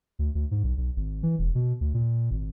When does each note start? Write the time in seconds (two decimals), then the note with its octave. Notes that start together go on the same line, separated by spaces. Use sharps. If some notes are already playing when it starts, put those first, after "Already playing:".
0.19 D2
0.35 D2
0.51 G#2
0.64 B1
0.77 B1
0.96 G#1
1.23 E3
1.39 E1
1.55 B2
1.81 D2
1.94 A#2
2.31 G#1